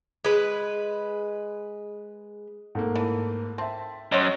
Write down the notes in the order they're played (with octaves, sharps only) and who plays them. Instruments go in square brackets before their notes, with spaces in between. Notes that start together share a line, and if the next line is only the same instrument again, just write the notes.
[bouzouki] G#3 B4
[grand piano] G#2 A3 A#3
[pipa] E3 A4
[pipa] C4 [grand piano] E5 A5
[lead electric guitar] F#2 [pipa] C5 C#5 D#5